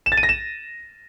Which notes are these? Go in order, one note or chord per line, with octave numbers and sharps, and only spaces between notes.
E7
A6
D#7
A#6
E7